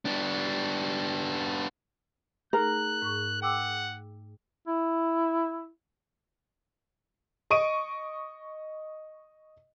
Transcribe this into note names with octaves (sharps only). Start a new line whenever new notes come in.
B3 D4
A3 D#4 G#4 A#4 F#6
G#2 C#6
F#5 G5 D6 E6
E4
D#5 C#6 D7 D#7